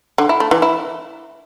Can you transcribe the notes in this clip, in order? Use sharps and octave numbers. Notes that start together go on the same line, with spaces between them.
D3
E4
A3
E3
E4